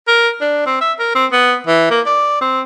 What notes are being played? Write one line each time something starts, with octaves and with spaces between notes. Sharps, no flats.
A#4
D4
C4
E5
A#4
C4
B3
E3
A#3
D5
C4